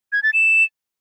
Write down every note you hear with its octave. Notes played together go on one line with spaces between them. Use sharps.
G#6
A6
E7